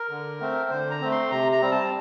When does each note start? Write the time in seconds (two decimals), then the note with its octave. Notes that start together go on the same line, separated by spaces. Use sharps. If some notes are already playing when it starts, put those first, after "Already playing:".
Already playing: A#4
0.10 D3
0.40 A3 C4
0.70 D3 C5
0.90 A#5
1.01 A3 C4
1.12 C6
1.31 C3 A#5
1.52 A#5
1.62 G3 C4
1.72 A5